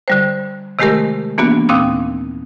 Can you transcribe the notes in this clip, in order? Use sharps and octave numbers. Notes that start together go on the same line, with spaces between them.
D3 G3 C5
C3 D#3 G#3 A3 G4 A#4
E3 A#3 B3 D4 F#4
D#2 A#2 C4 F5 D#6 E6